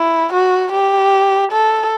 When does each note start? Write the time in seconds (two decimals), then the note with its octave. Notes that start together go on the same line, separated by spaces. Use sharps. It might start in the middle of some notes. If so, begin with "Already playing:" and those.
Already playing: E4
0.33 F#4
0.73 G4
1.52 A4